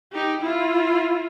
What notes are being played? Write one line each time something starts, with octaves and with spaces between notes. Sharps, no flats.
D#4 G4
E4 F4